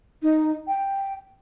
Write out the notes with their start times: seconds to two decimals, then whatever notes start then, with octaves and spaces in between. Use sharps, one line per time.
0.23 D#4
0.68 G5